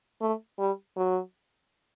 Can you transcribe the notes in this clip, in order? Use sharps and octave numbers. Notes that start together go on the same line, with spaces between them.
A3
G3
F#3